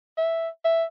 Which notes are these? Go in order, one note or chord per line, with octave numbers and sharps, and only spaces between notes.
E5
E5